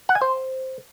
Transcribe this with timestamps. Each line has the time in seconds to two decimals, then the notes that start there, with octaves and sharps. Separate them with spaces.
0.09 F#5
0.15 G#5
0.22 C5